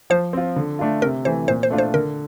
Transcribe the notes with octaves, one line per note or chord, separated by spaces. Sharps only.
F3 C5
C4 F4
D3
A3 D4 F4
C3 A#4
E3 A3 C5
A#2 C5
C5
A3 D4 F4
C5
D3 A#4